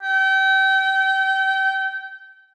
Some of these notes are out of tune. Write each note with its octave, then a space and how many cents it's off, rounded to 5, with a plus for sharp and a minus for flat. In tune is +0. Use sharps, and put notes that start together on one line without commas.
G5 -30